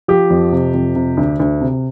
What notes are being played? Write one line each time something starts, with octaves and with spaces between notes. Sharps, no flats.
F3 G4
F2
C3
F2
C3
D2
D2
C3